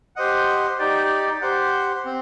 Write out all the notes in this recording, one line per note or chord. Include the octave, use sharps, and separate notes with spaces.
G4 C5 D#5 F#5
D#4 G4 D5
G4 C5 F#5
C4